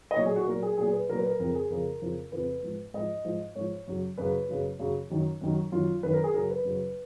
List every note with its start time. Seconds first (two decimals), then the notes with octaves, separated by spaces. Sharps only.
0.11 D#5
0.16 A#2 F#3 C#5
0.26 G#4
0.36 F#4
0.46 A#2 F#3 A#4
0.63 G#4
0.77 A#2 F#3 G#4
0.93 B4
1.09 A#2 F#3 A#4
1.17 B4
1.27 A#4
1.39 F2 C#3 F3 A#4
1.55 G#4
1.70 F2 C#3 F3 A#4
2.01 F2 C#3 F3
2.32 F2 C#3 F3 B4
2.63 G#2 F3
2.94 G#2 F3 D#5
3.25 G#2 F3
3.56 G#2 F3 C#5
3.88 F#2 C#3 F#3
4.18 F#2 C#3 F#3 B4
4.49 F#2 C#3 F#3
4.79 F#2 C#3 F#3
5.10 F#2 D#3 F#3
5.41 F#2 D#3 F#3
5.72 F#2 D#3 F#3 F4
6.03 F#2 D#3 F#3 B4
6.13 A#4
6.24 G#4
6.34 F#2 C#3 F#3 A#4
6.50 B4
6.65 F#2 C#3 F#3